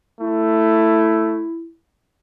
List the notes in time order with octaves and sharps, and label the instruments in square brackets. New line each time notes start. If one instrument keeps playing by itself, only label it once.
[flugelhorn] A3 [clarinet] E4